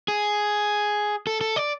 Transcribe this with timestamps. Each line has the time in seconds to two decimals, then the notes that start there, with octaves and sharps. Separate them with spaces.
0.08 G#4
1.27 A4
1.41 A4
1.56 D5